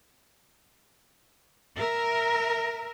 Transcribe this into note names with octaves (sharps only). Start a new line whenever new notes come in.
A#4 E5